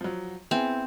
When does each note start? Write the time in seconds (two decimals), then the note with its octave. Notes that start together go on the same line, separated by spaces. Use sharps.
0.01 F3 F#3
0.51 B3 C4 E4 G#4